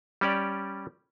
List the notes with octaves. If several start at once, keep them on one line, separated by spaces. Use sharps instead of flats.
G3 C#4 G4 D5